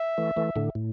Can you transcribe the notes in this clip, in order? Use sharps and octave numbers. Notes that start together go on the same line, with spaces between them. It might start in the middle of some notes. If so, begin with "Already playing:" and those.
Already playing: E5
E3 A3
E3 A3
A2 D3
A2